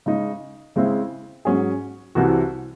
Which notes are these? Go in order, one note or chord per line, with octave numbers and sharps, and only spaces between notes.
C#3 G#3 D#4
C#3 G#3 C4 E4
G#2 F#3 C#4 G#4
C2 C3 E3 C4 F#4